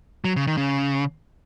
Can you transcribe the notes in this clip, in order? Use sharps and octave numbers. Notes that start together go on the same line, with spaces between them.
F#3
C#3
D#3
C#3